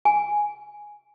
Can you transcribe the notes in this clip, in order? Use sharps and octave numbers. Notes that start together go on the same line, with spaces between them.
G#5